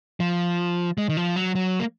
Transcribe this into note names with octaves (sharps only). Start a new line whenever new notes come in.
F3
G#3
D#3
F3
F#3
F#3
A#3